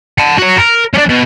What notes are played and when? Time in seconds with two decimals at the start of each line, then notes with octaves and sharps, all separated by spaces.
0.18 F#5 A5
0.38 F#4 C#5
0.58 A#4
0.94 C#4 D4
1.09 B2